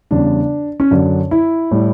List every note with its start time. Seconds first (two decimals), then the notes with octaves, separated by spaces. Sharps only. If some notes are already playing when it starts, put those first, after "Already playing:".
0.11 E2 C#3 G3 D4
0.80 C#4
0.91 F#2 D3 F#3 D4
1.31 E4
1.71 A2 G3